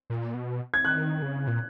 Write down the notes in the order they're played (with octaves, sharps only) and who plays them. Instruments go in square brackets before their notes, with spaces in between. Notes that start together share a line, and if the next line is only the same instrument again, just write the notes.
[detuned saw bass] A#2
B2
[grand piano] G#6
[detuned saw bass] D#3 [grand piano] F#6
[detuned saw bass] C#3
A#2